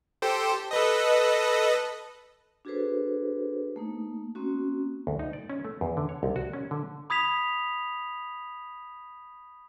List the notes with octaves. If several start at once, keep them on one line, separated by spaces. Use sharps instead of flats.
G4 A4 C5
A4 B4 D#5
D4 F#4 G#4 A4 B4 C5
A3 A#3 D#4
A#3 C4 C#4 F#4
D2
D#4
D5
C#4
A3
E2
D3
C#5
C2
F#4
C#4
D3
B5 D#6 G#6 B6 F7